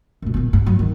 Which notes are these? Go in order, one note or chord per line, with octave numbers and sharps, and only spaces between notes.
F#2 B2
A#2 B3
G2
F#3
D#3